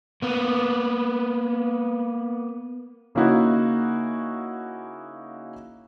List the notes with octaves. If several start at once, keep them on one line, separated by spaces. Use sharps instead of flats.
A#3 B3
C#3 A#3 C#4 D#4 E4 F#4